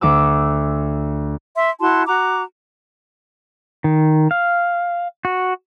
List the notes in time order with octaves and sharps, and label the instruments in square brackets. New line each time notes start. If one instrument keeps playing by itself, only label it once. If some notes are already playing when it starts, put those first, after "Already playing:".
[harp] D2 D6 E6
[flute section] E5 C6
E4 F#4 A5 C6
F#4 A#5 D6
[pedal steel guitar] D#3
F5
F#4